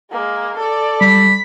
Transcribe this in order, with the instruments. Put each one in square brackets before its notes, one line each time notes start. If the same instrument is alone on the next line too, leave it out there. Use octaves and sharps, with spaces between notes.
[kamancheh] G#3 A#3
A4 D5
[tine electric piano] G3 [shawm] B5